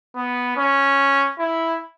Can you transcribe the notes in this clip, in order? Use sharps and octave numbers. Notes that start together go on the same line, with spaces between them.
B3
C#4
E4